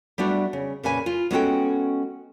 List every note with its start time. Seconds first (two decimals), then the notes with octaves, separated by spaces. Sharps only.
0.18 G3 A3 B3 D4 F#4
0.53 C#3
0.83 A#2 C#3 B4 G#5
1.06 F4
1.31 G#3 B3 C#4 F#4 A4 G5